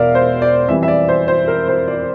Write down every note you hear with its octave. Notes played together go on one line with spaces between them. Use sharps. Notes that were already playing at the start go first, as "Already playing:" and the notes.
Already playing: E1 E2 A#4 D5 E5 F5
C5
D5
F2 E3 G3 E5
E5
D5
C5
C5
A#4
C5
D5